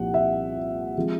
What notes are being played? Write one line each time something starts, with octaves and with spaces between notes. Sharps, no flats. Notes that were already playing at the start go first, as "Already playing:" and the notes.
Already playing: C2 A#2 F3 F#5
E5
F3 G#3 C4